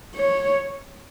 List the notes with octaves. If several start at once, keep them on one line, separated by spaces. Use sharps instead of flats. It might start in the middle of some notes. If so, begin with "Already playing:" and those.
C#5